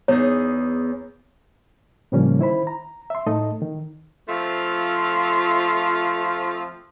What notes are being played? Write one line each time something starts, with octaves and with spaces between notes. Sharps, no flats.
E2 D#4 G#4 C#5
A2 C#3 F3 G3 A#3 C#4
D#3 E4 C5 B5
A#5
E5 C6
A2 A3 D#4 A4 D#5
D#3
F3 A3 C4 F4